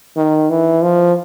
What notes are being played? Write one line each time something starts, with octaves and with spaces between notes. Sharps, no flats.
D#3
E3
F3